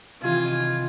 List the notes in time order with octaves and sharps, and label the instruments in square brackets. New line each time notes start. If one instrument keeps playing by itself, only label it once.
[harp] C3 D#3 E3 [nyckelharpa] F4 [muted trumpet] G#5